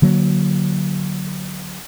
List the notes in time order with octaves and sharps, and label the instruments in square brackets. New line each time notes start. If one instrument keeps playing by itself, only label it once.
[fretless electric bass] D3 F#3 A#3